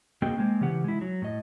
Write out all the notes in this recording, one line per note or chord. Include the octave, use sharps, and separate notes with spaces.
A#3 C4 F#4 G#4 D#5 G5
G#3 A#3 C4
C#3 E3 G4 F#5
G#3 E4
F#3
A2 D#5